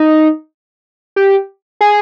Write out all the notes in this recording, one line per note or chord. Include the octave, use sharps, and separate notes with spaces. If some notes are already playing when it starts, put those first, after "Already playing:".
Already playing: D#4
G4
G#4